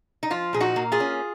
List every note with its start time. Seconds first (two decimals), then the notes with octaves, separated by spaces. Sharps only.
0.23 D#4
0.30 F3 F4
0.53 A#2 G#4
0.60 D#4 F#4
0.76 A#3
0.92 F4 G#4
1.00 C#4